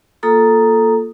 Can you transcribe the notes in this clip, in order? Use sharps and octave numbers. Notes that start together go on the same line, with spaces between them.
A#3 F4 A4 A#5 D#6